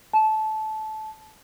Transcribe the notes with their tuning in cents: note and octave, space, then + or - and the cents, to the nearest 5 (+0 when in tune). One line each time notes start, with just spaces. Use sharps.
A5 -20